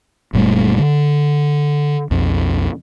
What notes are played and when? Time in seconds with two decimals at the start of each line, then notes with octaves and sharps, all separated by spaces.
0.33 F#1 A#2 G3 A3
0.79 D3
2.11 B1 F2